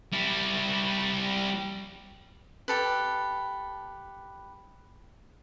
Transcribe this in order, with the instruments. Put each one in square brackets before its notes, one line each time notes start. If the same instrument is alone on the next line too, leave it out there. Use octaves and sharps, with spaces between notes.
[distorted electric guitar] G3 E4
[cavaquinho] G4 A4 B4